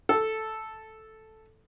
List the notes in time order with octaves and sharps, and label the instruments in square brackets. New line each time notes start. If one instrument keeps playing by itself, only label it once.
[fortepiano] A4